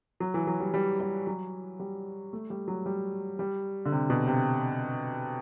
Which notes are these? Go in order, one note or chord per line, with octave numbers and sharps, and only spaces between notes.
F#3
E3
F#3
G3
G3
G3
F#3
G3
A3
G3
F#3
G3
G3
D3
C3
B2
C3